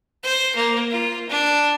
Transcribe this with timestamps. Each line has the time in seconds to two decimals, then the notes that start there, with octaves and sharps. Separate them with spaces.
0.23 C5
0.56 A#3
0.91 F4
1.29 D4